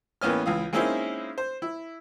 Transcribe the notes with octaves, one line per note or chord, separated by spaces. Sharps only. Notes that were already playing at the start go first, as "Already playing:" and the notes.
A1 E3 A#3 B3 C#4 F6
C#2 E3 F5 D#6
G#3 A#3 C4 C#4 D#4 E4
C5
E4